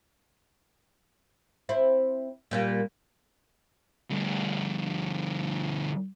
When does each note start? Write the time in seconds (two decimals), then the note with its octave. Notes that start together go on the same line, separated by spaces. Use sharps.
1.69 C4 E4
2.51 A#2 G3 A#3
4.10 D2 G2